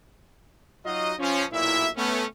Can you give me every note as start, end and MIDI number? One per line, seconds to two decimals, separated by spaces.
0.85 1.14 54
0.85 1.14 63
0.85 1.14 65
0.85 1.14 66
0.85 1.14 75
1.19 1.45 53
1.19 1.45 61
1.53 1.90 35
1.53 1.90 46
1.53 1.90 64
1.53 1.90 76
1.97 2.25 57
1.97 2.25 59
1.97 2.25 61